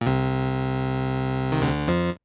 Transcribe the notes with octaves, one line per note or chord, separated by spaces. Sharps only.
A#2
C2 C3
D#3
D2 D3
F2 F3